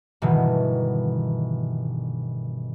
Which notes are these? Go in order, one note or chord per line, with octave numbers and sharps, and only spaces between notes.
G1 B2 D#3 E3